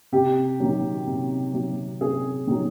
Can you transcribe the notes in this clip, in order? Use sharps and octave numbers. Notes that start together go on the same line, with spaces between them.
C3 G4
D#3 F#3
C3
D#3 F#3
C3 G#4
D#3 F#3